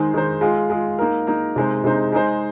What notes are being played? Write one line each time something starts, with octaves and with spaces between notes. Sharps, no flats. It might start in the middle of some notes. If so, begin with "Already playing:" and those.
Already playing: D#3 G#3 D#4 G#4 C5
D#3 G#3 D#4 G#4 C5
G#3 F4 G#4
G#3 F4 G#4
A#3 D#4 A#4
A#3 D#4 A#4
C3 G#3 D#4 C5
C3 G#3 D#4 C5
G#3 D#4 G#4 C5